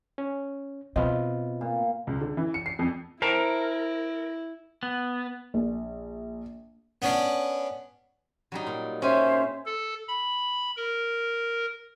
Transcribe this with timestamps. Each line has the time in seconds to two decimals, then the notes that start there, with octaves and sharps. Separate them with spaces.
0.18 C#4
0.96 B2 C4 F4 B4 D#5
1.61 A#2
2.07 C#2
2.21 D3
2.37 E3
2.54 C#7
2.66 C7
2.79 F2
3.22 E4 A#4 C5 G5 A5
4.83 B3
5.54 A#1
7.02 B3 C#4 D4
8.52 F#3 G3 D#4
8.67 A#2
9.02 C#4 G4 C5 C#5 E5 G#5
9.66 A4
10.08 B5
10.77 A#4